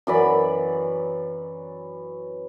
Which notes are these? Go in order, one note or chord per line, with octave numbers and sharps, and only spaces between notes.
F#2 E3 D5 B5